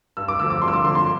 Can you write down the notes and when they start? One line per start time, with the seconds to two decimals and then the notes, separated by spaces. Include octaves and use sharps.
0.17 G2 E6
0.28 D6
0.40 D3 F3 E6
0.50 D6
0.62 G2 C6
0.68 E6
0.73 D6
0.84 D3 F3 C6
0.95 C6